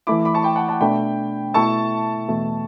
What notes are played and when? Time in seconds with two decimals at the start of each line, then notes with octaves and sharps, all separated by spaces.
0.07 E3 A3 E4 B5 D6
0.25 B5 D6
0.34 A5 C#6
0.43 G5 B5
0.56 F#5 A5
0.69 F#5 A5
0.81 B2 A3 D4 G5 B5
1.54 B2 A3 E4 A4 E5 A5 C#6
2.29 E2 B2 A3